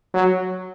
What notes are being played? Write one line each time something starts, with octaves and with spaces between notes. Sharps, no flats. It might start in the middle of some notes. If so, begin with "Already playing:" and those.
F#3